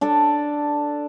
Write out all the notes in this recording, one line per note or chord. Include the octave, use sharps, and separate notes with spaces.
D4 A4 D5